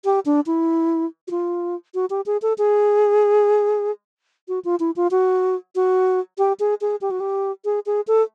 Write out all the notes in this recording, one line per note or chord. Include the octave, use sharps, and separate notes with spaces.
G4
D4
E4
F#4
F4
F#4
G4
G#4
A4
G#4
F#4
F4
E4
F4
F#4
F#4
G4
G#4
G#4
G4
F#4
G4
G#4
G#4
A4